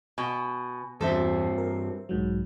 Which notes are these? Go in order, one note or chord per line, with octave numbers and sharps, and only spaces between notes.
B2 G#5
E2 G2 C4 A4 C5 E5
A#4
B1 G#2 F#3